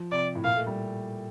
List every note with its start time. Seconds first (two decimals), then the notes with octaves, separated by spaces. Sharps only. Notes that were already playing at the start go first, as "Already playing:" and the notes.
Already playing: F3
0.12 C3 D5
0.35 A2
0.44 A#2 F5
0.56 A3
0.67 G3